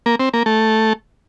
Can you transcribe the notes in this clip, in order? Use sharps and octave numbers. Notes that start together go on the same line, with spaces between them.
A#3
C4
A#3
A3